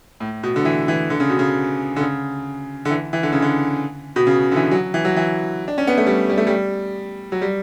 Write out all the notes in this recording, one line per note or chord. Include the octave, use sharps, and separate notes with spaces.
A2
B2
D3
E3
E3
D3
C#3
B2
C#3
D3
C#3
D3
E3
E3
D3
C#3
D3
B2
C#3
D3
E3
F#3
E3
F#3
E3
D4
C#4
B3
A3
G3
G3
A3
G3
F#3
G3